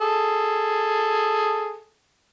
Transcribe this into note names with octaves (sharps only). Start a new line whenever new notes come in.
G#4 A4